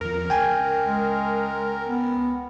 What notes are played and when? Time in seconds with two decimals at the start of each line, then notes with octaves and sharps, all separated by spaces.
0.01 E2 F3 A#4
0.30 C#2 G5 G#5
0.83 G#3
1.87 B3